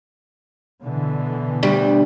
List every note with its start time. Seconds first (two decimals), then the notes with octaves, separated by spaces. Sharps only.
0.82 B2 D3 E3
1.63 D2 G3